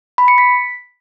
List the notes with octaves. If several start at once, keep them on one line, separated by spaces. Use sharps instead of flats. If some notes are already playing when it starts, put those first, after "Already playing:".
B5
C#7
B6